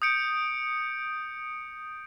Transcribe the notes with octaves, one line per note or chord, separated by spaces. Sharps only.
D#6 G6 C#7 D7